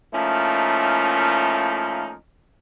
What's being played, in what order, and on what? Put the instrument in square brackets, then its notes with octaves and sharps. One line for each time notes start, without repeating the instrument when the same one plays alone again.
[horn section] F3 A3 A#3 C#4 D#4 E4